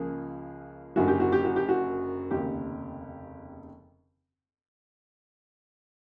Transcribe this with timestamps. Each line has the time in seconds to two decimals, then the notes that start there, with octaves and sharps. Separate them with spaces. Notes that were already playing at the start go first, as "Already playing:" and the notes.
Already playing: C#2 C#3 F3 A#3 C#4 G#4
0.96 F#1 F#2 D3 F#4
1.08 G4
1.20 F#4
1.32 G4
1.44 F#4
1.56 G4
1.69 F#4
2.31 F1 D#2 C#3 G4